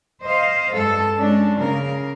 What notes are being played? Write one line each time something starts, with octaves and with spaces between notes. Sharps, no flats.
C5 D#5 F5
G2 G#3 A4
G#3 C#4 D4
C#3 A#3 A#4